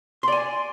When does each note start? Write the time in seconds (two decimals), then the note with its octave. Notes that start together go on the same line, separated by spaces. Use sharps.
0.23 C6
0.28 D5
0.32 G#5